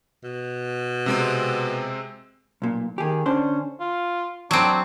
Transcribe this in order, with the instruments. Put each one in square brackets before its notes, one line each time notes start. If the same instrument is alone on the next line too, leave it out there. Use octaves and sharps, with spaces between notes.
[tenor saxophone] B2
[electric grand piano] C3 G#3 C4
[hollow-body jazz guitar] B1 A#2
[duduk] D#3 [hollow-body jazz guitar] G4 G#4
[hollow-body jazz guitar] D3 D4 C5 [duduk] C#4
[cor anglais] F4
[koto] F#3 C4 [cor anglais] D4